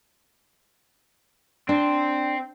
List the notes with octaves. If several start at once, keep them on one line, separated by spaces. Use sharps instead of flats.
C4 D4